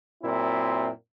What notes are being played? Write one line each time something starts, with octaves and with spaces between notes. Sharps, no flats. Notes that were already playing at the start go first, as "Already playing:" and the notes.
F#2 A#2 C4 E4